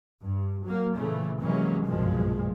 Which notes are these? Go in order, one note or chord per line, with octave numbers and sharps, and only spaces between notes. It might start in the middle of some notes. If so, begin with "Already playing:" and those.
G2
F#3 A#3
A#2 C#3 E3 A3
C3 E3 F#3 G#3 A#3 C#4
F#1 B1 G2 A#2 F3 G#3